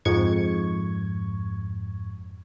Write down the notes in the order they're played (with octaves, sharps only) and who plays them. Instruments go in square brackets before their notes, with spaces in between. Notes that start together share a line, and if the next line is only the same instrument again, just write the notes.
[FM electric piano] F2 G#2 C#6 G#6